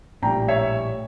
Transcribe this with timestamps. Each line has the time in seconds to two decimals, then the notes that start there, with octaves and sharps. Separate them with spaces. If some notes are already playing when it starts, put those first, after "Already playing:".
0.22 A#1 A2 G3 G5 A#5
0.48 C#5 E5